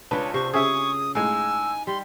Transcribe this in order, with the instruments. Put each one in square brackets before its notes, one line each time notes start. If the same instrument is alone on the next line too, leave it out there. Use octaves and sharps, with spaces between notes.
[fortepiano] C#2 B4 [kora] D4 F4 [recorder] C#5
[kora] C3 C5 [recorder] C#6
[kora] C#3 [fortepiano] G#4 E5 [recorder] C#6 [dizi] D#6
[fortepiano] A2 G#3 [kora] D#4 F5 [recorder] G#5 [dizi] E6
[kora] G3 [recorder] C6